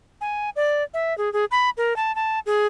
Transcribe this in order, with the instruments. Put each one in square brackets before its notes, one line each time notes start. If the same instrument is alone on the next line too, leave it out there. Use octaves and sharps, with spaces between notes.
[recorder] G#5
D5
E5
G#4
G#4
B5
A#4
A5
A5
G#4